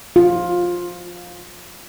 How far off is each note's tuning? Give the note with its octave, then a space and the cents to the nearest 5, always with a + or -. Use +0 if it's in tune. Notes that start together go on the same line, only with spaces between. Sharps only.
F4 +15